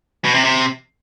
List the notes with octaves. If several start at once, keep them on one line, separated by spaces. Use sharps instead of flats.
B2
C3
C3